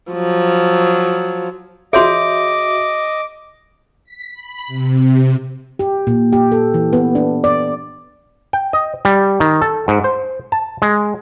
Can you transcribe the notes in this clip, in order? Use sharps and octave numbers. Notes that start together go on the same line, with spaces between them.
F3 F#3
F#4 G#4 C#5 D#5 E5 C6 D6
B6
B5
C3
G4
A#2
G4
A4
E3
B3
D4
D5
G5
D#5
G3
D#3
A4
G#2
C5
A5
G#3